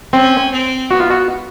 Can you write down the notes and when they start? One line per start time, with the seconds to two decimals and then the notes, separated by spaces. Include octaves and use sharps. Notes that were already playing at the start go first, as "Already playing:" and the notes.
0.13 C4 C#4
0.52 C4
0.91 B3 F#4
1.00 F4
1.10 F#4